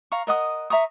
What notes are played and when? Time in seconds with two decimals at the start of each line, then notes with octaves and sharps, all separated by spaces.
0.12 F5 A#5 C#6
0.27 A#4 D#5 F#5 D#6
0.70 E5 A#5 C#6 D#6